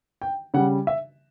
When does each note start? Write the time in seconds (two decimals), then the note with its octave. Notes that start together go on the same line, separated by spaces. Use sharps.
0.22 G5
0.54 C#3 G3 F#5
0.87 E5